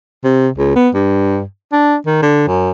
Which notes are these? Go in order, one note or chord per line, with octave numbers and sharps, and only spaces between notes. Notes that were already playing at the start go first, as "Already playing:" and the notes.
C3
C#2
B3
G2
D4
D#3
D3
F#2